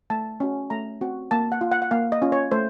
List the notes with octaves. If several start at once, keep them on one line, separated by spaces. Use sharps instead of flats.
A3 A5
C#4 F#4
A3 A#5
C4 F#4
A#3 A5
F#5
F4
F#5
F#5
A#3 F5
D#5
C#4 F4
C#5
A3 C5